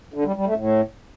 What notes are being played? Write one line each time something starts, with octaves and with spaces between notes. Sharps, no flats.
D3
G3
G3
A3
A2